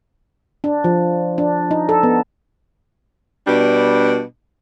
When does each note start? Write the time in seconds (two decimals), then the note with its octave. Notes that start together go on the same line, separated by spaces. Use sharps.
0.64 D4
0.84 F3
1.38 D4
1.71 D#4
1.89 A4
2.03 B3
3.47 B2 G3 D4